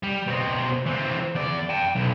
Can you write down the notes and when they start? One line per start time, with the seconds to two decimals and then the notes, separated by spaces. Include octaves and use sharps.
0.03 G3
0.27 B2 C4
0.86 E3 C4
1.36 E2 D5
1.70 G5 A5
1.95 B1